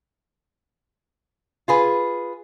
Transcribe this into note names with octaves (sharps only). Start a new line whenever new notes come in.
F4 G#4 B4